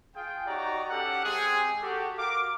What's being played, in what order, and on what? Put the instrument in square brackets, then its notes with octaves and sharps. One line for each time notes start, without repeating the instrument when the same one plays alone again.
[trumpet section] F4 G#4 G5
D#4 F#4 G4 C#5 D5 A#5
C#4 G4 A4 F#5
G#3 C4 G4 G#4
F#4 G4 A4
F#4 A#4 F5 D6